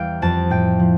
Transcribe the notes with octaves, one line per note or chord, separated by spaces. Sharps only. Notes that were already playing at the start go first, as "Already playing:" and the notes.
Already playing: E2 G3 F5 G5
F2 A5
A2 G5
F3